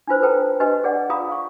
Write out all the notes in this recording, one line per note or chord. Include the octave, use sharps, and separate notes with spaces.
D4 E4 F4 B4 C5
A4 B4 G5 A5 A#5
D4 F#4 G4 B4 D#5
G#4 D5 F#5
F4 G#4 F5 A#5 B5 D#6
F5 C#6